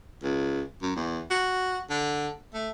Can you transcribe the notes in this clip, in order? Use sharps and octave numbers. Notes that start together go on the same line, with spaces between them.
C#2
F#2
E2
F#4
D3
A3